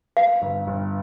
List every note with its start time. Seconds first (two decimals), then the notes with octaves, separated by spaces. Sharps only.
0.17 C4 F5
0.42 G1
0.67 G1